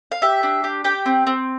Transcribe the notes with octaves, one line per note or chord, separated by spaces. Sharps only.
F5
G4 E5
D4
G4
G4 G5
C4
C4